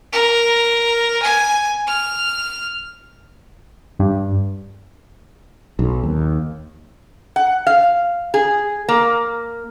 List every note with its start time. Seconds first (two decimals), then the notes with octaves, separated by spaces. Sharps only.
0.13 A#4
1.23 G#5
1.88 F6
3.99 G2
5.79 B1
6.03 D#2
7.36 F#5
7.67 F5
8.34 G#4
8.89 A#3